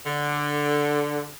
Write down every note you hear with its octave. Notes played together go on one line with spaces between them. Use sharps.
D3